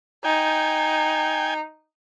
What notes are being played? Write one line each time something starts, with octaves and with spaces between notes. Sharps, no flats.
D#4 G5 G#5